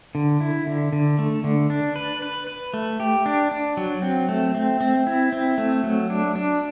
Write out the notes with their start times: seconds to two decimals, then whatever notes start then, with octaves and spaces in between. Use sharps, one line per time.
0.15 D3
0.41 E4
0.67 D3
0.93 D3
1.19 A3
1.44 D3
1.70 D4
1.96 B4
2.22 B4
2.47 B4
2.74 A3
3.00 G4
3.26 D4
3.51 D4
3.77 F#3
4.02 C4
4.29 A3
4.55 C4
4.81 C4
5.07 E4
5.32 C4
5.58 A3
5.84 F#3
6.10 D4
6.36 D4